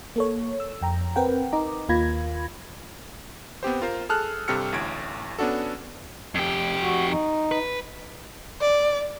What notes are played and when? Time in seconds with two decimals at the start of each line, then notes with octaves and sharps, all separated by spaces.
0.16 A#3 A4 C#5
0.60 E6
0.82 F2 G5 A#5
1.16 C4 A#4 B4 F#5 G5
1.52 D#4 D#5 A#5 D6
1.89 D#2 A#3 F4 B5 G#6 A#6
3.63 B3 C4 G4 C5
3.82 F4 A#4 C5
4.09 G#4 A4 A5 F6 F#6
4.48 G2 C3 G4 A4 F6 C#7
4.72 A1 D2 A2 G#6 D7
5.39 B3 C#4 D4 F#4 A4
6.35 F2 G4
6.82 F#4
7.09 D#4
7.52 B4
8.62 D5